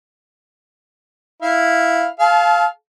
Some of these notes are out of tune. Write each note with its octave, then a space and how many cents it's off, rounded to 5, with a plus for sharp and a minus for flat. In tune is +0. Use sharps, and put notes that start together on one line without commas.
E4 +0 F5 +0
A4 -45 F5 +0 A5 -30